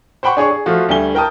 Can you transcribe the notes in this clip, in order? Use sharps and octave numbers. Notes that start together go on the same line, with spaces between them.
C5 F#5 G5 B5 C#6
D4 G#4 C#5 C#6
G#4
F3 A3 F4 F#4
D2 G3 A3 G#5 G7
A#4 G5 A5 D#6